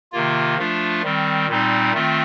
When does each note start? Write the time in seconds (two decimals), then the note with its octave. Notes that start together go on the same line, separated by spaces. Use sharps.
0.12 C3 D#3 A#3 F4
0.57 F3 A3 D4 F4
1.03 D#3 G3 C4
1.47 A#2 G3 C4 D#4
1.93 D#3 A3 C4 F4